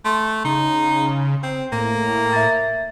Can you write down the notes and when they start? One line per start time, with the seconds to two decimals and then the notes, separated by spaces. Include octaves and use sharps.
0.05 A3 C6
0.45 C#3 D#4
1.43 C4
1.72 A2 A#3
2.33 E5 A6